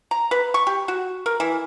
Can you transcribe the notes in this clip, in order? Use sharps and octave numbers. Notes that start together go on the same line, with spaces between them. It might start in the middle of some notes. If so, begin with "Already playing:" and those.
A#5
B4
C#6
G4
F#4
A#4
E3